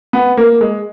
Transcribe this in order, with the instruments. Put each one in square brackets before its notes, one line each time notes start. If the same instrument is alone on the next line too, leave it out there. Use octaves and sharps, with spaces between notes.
[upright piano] B3
A#3
G#3